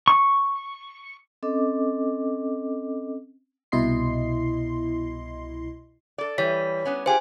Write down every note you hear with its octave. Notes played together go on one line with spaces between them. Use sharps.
C#6
C4 C#4 A4 D#5 D6
C2 B2 E4 D#5 C6 C7
A4 D5
E3 G3 C#5 B6
G3 B3 C#4
F4 G4 G#4 C5 G#5